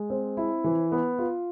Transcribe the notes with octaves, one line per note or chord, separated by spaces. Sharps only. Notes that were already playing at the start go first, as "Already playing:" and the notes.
Already playing: G#3
C4
E4
E3
B3
F4